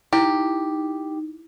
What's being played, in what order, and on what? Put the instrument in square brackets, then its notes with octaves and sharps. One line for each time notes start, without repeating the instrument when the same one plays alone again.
[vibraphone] D#4 [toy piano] E4 [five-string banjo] G4